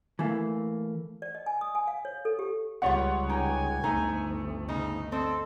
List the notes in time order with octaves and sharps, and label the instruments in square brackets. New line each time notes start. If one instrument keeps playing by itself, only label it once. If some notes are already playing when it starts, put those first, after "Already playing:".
[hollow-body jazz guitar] E3 A3 A#3
[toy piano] D5
D#5
G#5
D#6
G#5
F5
C#5
A4
G4
[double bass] C#2 G3 [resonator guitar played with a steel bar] B3 F4 G4 [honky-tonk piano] C#5 F#5
[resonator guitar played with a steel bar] D#4 G5 [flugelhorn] G#5
[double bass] G1 D2 [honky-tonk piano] A3 [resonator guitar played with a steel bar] D#4
[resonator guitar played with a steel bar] C#3 [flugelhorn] D#4
[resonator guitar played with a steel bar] C4 D#5 [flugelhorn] A4